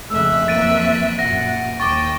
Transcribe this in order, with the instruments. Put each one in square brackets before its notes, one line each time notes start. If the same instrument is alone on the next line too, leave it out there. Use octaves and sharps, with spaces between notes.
[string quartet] F2 E5 F#6 [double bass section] C#3 G#3 A3 [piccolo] E6
[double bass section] F#2 E3 A#3 [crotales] A6 D7 D#7
[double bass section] F#2 A#2 [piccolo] F#5 [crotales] A#6
[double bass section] D#2 [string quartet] G5 [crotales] C#6 D6 [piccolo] A6